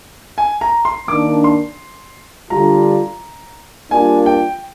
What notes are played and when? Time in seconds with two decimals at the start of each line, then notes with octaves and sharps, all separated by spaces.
0.38 G#5
0.61 A#5
0.85 C6
1.08 D#3 A#3 D4 D6
1.44 C6
2.50 D3 G3 D4 F4 A#5
3.90 G3 A#3 D4 F4 G#5
4.26 G5